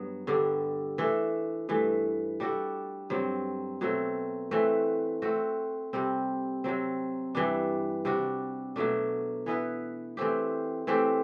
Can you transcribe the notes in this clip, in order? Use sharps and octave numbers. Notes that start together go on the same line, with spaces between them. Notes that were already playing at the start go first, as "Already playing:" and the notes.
Already playing: G2 F#3 B3
G2 D3 G3 D4
E3 A3 D4 A4
G2 E3 A3
G3 D4 F#4 A4
G2 F#3 C4
B2 F#3 A3 C4
E3 A3 C4 F#4
A3 C4 F#4
C3 G3 C4
C3 F#3 C4
G2 E3 G3 D4
C3 G3 D4 F#4
B2 F#3 A3 D4
E3 B3 E4 B4
E3 A3 C4 G4
E3 A3 C4 G4